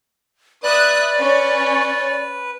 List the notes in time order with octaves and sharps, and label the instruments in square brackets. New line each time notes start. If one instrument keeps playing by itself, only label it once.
[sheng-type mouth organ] B4 [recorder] D5 [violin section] E5 D#6 F#6
[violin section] C#4 C#5